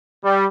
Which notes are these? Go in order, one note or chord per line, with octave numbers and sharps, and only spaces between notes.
G3